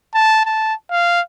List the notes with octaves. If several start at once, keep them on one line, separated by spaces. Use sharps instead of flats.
A5
A5
F5